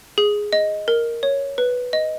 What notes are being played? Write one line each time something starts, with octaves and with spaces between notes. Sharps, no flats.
G#4
D#5
A#4
C#5
B4
D#5